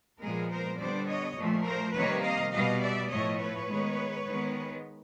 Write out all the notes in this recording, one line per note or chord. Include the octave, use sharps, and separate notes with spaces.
A#2 F3 G#3 B3 G#4 A#4
A#4 C5
D3 G3 B3 C5 D5
C#5 D#5
A#2 F3 A3
A#4 C5
C3 D#3 G3 A#3 B4 C#5
D#5 F5
B2 G3 B3 D#5 F5
D5 E5
A2 F3 A3 C#5 D#5
B4 C#5
D#3 G#3 B3
D#3 G#3 B3